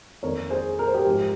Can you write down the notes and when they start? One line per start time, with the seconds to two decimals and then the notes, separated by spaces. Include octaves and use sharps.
0.23 F2 D#3 A#3 A#4 C#5
0.50 G#4 C5
0.79 A#4
0.87 C5
0.94 G4 A#4
1.06 G#2 F3 C4